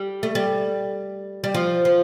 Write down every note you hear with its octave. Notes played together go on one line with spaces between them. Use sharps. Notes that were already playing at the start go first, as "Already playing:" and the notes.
Already playing: G3
A3
G3
G3
F3
F3